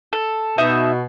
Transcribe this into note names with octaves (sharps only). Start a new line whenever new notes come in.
A4
B2 D#4 E5 D#6